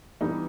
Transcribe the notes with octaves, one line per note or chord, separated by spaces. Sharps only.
E3 G3 B3 D4 D#4